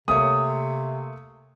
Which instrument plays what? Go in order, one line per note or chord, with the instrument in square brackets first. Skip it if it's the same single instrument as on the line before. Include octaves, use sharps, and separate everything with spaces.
[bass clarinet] C3 [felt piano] A3 A#3 C#5 [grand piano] D#6